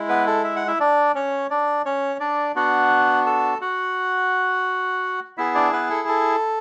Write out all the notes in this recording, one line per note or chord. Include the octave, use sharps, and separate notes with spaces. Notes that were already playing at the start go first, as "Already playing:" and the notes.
Already playing: G#3 E4
B3 B4
A4
E5
F#5
E4 E5
D4 D5
C#4 C#5
D4 D5
C#4 C#5
D4 D5
B3 D4 F#4 F#5
A4 A5
F#4 F#5
B3 E4 G#4 E5
D4 D5
B3 B4
A4
A4